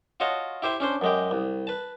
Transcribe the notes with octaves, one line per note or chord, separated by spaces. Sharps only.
F4 F#4 C#5 D#5 A5
E4 G4 C5 E5
C#4 D4 C5
F#2 G#3 G4
C2
B4 A5